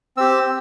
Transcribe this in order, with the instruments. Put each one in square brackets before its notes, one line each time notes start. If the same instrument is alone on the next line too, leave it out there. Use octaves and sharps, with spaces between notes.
[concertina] C4 G4 E6